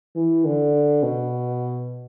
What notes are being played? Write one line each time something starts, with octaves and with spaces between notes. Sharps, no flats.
E3
D3
B2